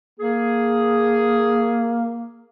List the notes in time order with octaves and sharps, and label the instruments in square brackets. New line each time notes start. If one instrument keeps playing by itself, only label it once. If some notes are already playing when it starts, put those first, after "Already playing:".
[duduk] A#3 [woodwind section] G#4